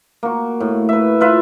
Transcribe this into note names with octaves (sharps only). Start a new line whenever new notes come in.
A#3 F#4
A2
B4 E5
F4 B4 E5